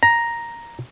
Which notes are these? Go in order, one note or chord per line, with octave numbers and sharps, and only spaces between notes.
A#5